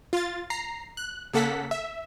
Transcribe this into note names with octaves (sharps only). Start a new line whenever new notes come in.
F4 A6
A#5 C7
F#6
C#3 A#3 A4 F#5 B6
E5